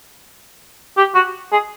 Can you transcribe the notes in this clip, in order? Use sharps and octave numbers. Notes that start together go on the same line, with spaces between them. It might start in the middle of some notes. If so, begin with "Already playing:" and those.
G4
F#4
G#4